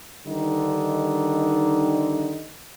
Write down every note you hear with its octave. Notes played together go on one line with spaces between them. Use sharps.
G2 D3 D#3 D#4